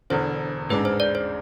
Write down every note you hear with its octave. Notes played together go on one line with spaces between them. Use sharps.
E1 E2 D3 C5
A1 G#2 G#3 D4 B4
C5
D5
C5